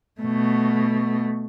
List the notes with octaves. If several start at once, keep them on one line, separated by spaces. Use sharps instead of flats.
B2 A3